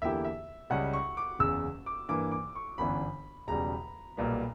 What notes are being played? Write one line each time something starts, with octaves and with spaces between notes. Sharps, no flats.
E2 D3 A#3 E4 G4 E5
E5
C#2 C#3 G3 C#4 F#5
C#6
D6
F#1 E2 C#3 E6
D6
G2 E3 A#3 D6
D6
C#6
G1 F#2 E3 B3 D4 B5
E1 E2 C#3 G3 A#5
B1 A#2 G3 B3